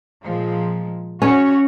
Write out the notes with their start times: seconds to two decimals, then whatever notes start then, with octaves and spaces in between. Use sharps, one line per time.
0.22 A#2 F3 G#3
1.22 C#4 F#4 C#5